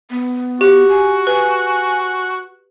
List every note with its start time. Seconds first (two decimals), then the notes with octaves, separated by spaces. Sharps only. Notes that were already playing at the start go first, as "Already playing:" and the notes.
0.11 B3
0.61 F#4 G4
0.89 G#5
1.27 B4 G#5